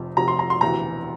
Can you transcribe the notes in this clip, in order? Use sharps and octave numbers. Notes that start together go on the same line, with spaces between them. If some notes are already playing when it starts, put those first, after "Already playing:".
Already playing: F1 F2 C3
F1 F2 C3 A#5
C6
A#5
C6
E1 D2 C3 E3 A#5